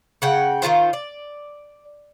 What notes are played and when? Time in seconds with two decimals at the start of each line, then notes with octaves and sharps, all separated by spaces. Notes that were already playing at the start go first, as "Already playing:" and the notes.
0.22 C#3 F#5 G5
0.62 D#3 E4 F4 C5
0.93 D5